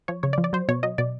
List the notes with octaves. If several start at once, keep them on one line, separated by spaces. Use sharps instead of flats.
F3 C#5
C#3 C#5
D5
F3
D5
F#3 C5
B2 C#5
F#3 D#5
B2 D5